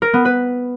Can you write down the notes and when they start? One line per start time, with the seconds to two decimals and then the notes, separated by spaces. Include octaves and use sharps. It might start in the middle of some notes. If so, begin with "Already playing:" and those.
0.02 A#4
0.14 B3
0.25 B4